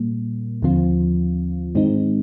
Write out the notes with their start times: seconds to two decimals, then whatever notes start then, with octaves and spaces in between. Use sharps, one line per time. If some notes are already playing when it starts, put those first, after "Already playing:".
Already playing: A#2 G3 A#3
0.62 D#2 D3 F3 C4 F4
1.75 G#2 D#3 G#3 C4 D#4